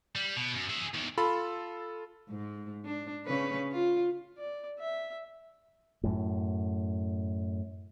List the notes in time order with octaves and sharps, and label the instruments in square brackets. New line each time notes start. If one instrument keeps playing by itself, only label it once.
[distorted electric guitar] G3
B2
F#2
G#4 E5
E2 D#3
[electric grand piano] F4 A4 B5
[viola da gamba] G#2
D4
C#3 C#4 B4
F4
[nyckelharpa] D5
E5
[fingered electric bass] F#2 A2